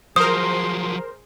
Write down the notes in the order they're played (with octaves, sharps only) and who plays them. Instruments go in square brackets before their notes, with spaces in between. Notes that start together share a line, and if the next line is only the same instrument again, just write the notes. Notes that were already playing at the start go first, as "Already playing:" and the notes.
[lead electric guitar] F3 F#3 [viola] G#4 C6 [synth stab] A#4 C5 [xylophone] D#6